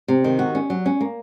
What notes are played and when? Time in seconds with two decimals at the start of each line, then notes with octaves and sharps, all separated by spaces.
0.08 C3
0.24 D#3
0.39 F#4
0.55 C#4
0.70 F#3
0.86 C#4
1.01 A#3